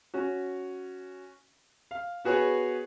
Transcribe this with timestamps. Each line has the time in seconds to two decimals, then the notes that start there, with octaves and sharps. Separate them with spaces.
0.14 C#4 F#4
1.91 F5
2.24 B3 F#4 G#4 B4 C#5